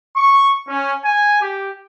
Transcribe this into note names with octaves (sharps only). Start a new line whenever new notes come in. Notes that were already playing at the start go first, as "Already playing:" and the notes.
C#6
C#4
G#5
G4